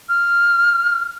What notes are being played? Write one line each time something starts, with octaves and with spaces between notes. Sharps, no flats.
F6